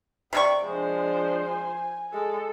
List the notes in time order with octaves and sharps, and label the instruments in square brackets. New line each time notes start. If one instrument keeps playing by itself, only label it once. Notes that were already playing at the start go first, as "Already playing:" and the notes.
[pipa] C3 E4 C#6 [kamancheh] D5 G5
[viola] F3 C5 [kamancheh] G#3 D4
[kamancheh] G#5
[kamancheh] G#3 [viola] A4